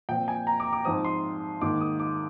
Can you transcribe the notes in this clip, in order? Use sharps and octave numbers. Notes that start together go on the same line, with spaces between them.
A#2 F3 C4 G5
G#5
A#5
D6
D6
G#2 F3 C4 D#6
C6
G#2 D#3 A#3 D6
D#6
D6